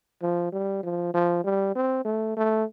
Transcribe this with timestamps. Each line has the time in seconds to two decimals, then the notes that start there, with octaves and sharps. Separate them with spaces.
0.22 F3
0.52 G3
0.83 F3
1.14 F3
1.44 G3
1.75 C4
2.05 A3
2.37 A3